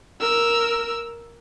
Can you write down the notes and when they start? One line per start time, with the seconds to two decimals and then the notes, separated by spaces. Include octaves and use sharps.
0.20 A#4 E6